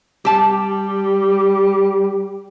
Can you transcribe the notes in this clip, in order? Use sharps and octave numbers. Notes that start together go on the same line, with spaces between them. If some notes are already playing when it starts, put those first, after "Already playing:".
G3 G4 A5